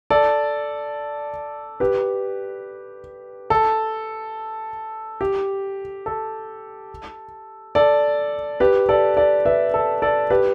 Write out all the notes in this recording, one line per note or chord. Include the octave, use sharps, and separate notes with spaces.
A4 D5
G4 B4
A4
G4
A4
A4 D5
G4 B4
A4 D5
A4 D5
B4 E5
A4
A4 D5
G4 B4